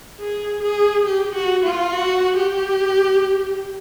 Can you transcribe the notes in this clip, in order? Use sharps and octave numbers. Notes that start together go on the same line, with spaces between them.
G#4
G#4
G4
F#4
F4
F#4
G4